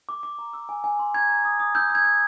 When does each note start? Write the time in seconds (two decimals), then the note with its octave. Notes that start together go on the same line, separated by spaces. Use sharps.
0.09 D6
0.23 D6
0.39 A#5
0.54 E6
0.69 G#5
0.84 G#5
0.99 C6
1.14 A#5 G#6
1.29 A#5
1.45 D#6
1.60 D#6
1.75 E6 G6
1.90 E6
1.95 G#6
2.05 G6